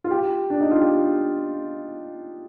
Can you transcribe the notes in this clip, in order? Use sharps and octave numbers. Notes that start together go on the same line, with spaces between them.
F4
G4
D4
D#4
F4
G4